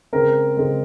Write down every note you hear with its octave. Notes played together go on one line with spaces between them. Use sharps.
C#3 G#3 C4 A#4
C#3 G#3 C4